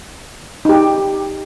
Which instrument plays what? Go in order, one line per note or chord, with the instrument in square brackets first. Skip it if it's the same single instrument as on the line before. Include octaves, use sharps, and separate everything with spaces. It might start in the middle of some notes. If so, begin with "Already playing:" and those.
[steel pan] D#4 G4